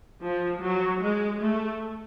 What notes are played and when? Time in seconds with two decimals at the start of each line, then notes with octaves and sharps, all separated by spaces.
0.23 F3
0.63 F#3
1.01 G#3
1.40 A3